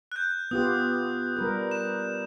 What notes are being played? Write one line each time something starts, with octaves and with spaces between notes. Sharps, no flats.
F#6 G6
B3 F4 G4 D#6
G3 A#4 B4
E7